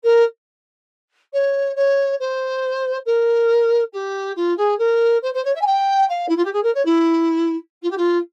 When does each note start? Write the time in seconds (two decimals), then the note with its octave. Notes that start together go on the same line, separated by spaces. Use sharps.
0.03 A#4
1.33 C#5
1.76 C#5
2.19 C5
3.05 A#4
3.93 G4
4.36 F4
4.57 G#4
4.78 A#4
5.22 C5
5.34 C5
5.44 C#5
5.55 E5
5.61 G#5
5.66 G5
6.09 F5
6.28 E4
6.36 F4
6.44 G4
6.53 G#4
6.63 A#4
6.74 C#5
6.85 E4
7.82 F4
7.90 G4
7.97 F4